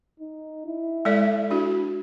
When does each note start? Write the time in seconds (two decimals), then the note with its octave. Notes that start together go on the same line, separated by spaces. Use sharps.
0.20 D#4
0.67 E4
1.05 G#3 A4 D5
1.50 D4 F#4